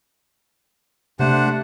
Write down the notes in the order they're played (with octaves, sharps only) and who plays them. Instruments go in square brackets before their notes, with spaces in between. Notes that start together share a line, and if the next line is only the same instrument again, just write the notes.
[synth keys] C3 [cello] A3 [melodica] D4 C5 F#5